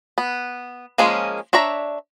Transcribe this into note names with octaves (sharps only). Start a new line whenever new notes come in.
B3
F3 G#3 A#3 C#4 G#4
D4 C#5 E5 A#5